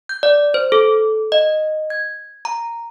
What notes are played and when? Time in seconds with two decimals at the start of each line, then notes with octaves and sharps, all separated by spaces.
0.09 G6
0.23 D5
0.54 C5
0.72 A4
1.32 D#5
1.90 G#6
2.45 A#5